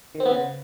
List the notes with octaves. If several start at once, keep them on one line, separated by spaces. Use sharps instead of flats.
D#3
C4
B3
C#3